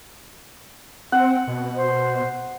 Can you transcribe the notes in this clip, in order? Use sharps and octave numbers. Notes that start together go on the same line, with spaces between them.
C4 F#5
B2
C5